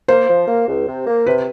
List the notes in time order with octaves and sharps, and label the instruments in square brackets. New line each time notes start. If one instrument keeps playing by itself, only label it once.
[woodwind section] A#3 [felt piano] C5
[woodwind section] F3
A#3
C#2
C3
A#3
[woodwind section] C3 [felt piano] B4